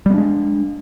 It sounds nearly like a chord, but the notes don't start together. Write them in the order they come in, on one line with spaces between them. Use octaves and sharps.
G3 B3 D4 G#3